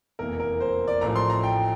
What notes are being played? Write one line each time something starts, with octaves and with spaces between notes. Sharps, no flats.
F1 E2 E3 A#3 A#4
A#4
C5
D5
A1 A2 F3 A#5
C6
A#5
G5